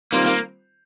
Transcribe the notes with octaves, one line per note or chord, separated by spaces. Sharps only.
D#3 G3 A#3 C4 F4 C5
A#3